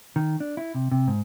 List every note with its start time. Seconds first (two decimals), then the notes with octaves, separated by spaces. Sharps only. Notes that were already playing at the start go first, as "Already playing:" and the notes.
0.16 D#3
0.40 D4
0.57 E4
0.75 C3
0.91 C3
1.08 G#2